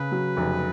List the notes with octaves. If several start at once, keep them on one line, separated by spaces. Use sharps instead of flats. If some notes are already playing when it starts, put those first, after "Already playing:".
Already playing: C#3 B4
F#3
F1